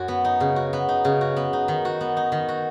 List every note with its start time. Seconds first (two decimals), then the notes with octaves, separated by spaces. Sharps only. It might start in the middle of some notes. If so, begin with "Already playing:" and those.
Already playing: F#2 F#3 F#4
0.08 B3
0.25 D#4
0.40 C#3
0.56 F#4
0.73 B3
0.89 D#4
1.05 C#3
1.21 F#4
1.36 B3
1.53 D#4
1.68 D#3
1.85 F#4
2.01 B3
2.17 D#4
2.32 D#3
2.49 F#4